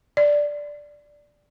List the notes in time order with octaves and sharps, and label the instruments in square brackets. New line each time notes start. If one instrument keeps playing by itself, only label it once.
[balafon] D5